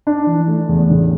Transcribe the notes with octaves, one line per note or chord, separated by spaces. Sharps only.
D4
E3
A3
E2
A1